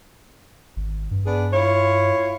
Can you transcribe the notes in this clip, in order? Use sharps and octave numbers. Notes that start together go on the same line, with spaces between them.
G#1
G2
B3 D4 G#4
E4 F4 C#5